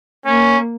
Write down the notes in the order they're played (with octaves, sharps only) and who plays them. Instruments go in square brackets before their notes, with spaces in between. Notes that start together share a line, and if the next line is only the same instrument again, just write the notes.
[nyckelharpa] A#3 [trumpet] C#4